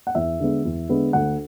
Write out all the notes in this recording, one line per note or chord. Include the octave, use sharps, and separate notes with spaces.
F#5
E2 E5
D3 G#3 B3
E2
D3 G#3 B3
D2 F#5